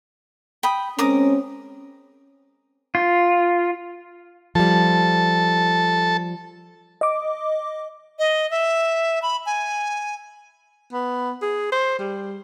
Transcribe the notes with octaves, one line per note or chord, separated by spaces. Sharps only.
G5 B5 D#6
G#3 C4 C#4 A#4 D6 D#6
F4
F3 G3 A4 A5
D#5 D6
D#5
E5
B5
G#5
B3
G#4
C5
G3